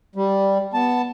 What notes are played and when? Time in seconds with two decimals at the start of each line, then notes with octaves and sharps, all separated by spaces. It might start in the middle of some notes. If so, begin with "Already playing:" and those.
0.16 G3
0.74 B3 A5